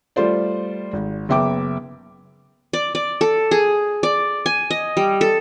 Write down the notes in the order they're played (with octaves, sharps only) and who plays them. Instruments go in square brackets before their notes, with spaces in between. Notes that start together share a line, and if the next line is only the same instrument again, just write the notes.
[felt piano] G3 A3 F4 C5 D5
G#1
F#1 B3 E5 G5 D6
[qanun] D5
D5
A4
G#4
D5
G#5
D#5
G3
A4